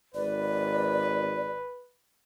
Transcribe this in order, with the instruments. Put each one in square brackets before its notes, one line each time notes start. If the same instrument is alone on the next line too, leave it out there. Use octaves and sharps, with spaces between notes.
[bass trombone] G#1 [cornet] B4 [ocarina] D5